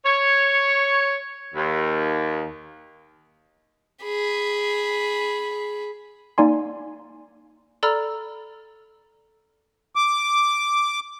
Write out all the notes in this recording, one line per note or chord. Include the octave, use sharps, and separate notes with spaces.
C#5
D#2
G#4 B5
A#3 D#4 D5 G#5 C6
A4 D5 A#5 B5 E6 F6
D6